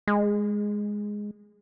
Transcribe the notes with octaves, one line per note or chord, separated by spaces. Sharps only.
G#3